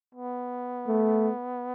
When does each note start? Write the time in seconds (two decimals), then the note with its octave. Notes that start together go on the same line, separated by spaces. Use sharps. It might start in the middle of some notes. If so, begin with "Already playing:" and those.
0.15 B3
0.87 A3